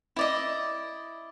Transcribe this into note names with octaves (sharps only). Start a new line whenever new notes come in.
E4 D5 D#5